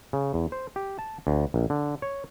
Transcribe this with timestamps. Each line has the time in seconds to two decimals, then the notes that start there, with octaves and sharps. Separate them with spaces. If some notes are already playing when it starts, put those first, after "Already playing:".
0.13 C#3
0.34 E2
0.52 C5
0.76 G4
0.99 A5
1.27 D2
1.54 A#1
1.70 D3
2.02 C#5